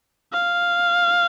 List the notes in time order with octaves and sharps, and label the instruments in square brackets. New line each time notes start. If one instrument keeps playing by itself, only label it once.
[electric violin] F5